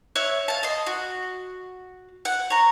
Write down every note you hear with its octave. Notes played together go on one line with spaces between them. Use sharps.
C#5 E5 F#6
F5 A5
D#5 C6
F#4
F#5
C#5 A#5